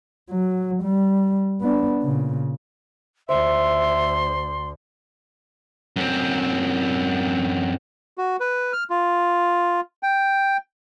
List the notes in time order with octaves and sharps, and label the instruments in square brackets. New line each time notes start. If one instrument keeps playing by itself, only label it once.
[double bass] F#3
G3
B3 D4
A#2 C#3
[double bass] D2 [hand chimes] C5 [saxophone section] E5 [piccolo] C6
[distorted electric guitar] F#2 C4
[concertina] F#4
B4
F6
F4
G5